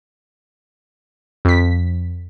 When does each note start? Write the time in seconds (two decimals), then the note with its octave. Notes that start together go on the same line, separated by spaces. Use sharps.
1.45 F2 B6